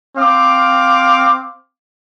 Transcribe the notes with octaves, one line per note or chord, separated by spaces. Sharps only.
C4 F5 D6